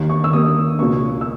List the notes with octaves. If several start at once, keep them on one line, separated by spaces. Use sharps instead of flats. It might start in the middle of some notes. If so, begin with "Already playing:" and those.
Already playing: D#2 D#3 A#3
C#6
E6
D#2 D#3 A#3 D#6
C#2 B2 A#3 C#6
E6